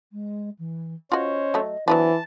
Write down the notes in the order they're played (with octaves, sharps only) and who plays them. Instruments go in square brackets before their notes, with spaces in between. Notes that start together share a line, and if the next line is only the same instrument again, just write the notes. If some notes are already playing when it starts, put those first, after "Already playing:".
[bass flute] G#3
E3
[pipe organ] C#4 C5 C#5 [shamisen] F4 F#4 [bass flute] D#5
[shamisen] F#3 A3
[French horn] E3 [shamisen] F#3 B3 D4 [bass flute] C5 [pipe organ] A5